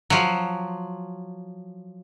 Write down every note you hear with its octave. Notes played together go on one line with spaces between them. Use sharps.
F3 F#3